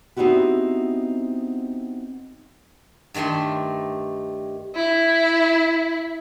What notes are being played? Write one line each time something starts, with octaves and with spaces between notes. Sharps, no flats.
B3 C4 D#4 E4 F#4 G4
G2 D#3 A3 E5 C6
E4